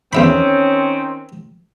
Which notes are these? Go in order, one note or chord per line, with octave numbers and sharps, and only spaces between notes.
E2 D#3 C4 C#4 E5 B5